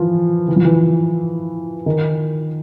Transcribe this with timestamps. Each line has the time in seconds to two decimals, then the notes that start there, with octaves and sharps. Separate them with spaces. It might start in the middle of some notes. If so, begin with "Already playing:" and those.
Already playing: E3 F3
0.48 E3
0.56 F3
0.65 E3
1.86 D#3